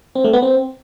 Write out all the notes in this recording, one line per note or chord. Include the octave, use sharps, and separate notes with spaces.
C4
A3
B3
C4